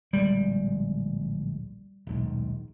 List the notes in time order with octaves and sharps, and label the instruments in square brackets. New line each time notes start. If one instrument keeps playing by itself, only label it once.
[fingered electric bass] D1 A#1 G#3 [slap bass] G3
[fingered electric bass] D#1 B1 G#2